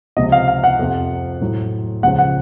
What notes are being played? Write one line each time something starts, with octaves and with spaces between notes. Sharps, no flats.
C#2 C3 F3 D#5
F5
F5
F#5
F2 C3 F3
A2 F#3
C#2 C#3 F3 F#5
F#5